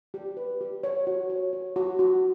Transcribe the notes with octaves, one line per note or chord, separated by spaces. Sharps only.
G4
B4
G4
C#5
F#4
C#5
C#5
F#4
F#4